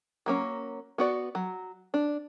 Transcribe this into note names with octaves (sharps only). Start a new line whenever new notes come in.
F#3 A#3 C#4
B3 F#4 D5
F#3
D4